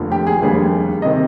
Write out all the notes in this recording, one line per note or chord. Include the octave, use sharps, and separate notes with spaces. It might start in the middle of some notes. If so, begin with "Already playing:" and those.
Already playing: F1 D#2 D3 F3
G4
G#4
F1 D#2 D3 G3 G#4
C3 D#3 D#5